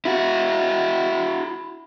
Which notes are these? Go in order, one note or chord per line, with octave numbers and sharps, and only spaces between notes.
E4 F#4